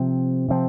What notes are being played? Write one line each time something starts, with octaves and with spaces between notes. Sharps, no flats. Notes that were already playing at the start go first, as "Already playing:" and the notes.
Already playing: C3 F3 C4
C3 F3 C4